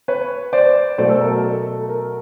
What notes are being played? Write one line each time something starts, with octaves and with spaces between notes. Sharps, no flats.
B4 C#5
C5 D5
B2 F#3 A3 C5 D5
A4
A#4
A4
A#4